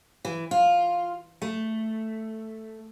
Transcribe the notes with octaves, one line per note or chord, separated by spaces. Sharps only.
E3
F4
A3